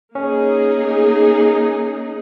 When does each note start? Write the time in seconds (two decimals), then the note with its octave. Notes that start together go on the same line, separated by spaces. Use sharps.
0.15 A#3 C#4 D#4 G#4